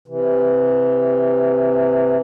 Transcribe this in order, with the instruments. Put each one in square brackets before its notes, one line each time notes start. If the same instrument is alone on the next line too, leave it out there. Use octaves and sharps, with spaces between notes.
[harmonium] C3 E3